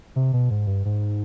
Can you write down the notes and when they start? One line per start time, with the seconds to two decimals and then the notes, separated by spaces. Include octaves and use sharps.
0.16 C3
0.33 B2
0.51 G#2
0.67 G2
0.85 G#2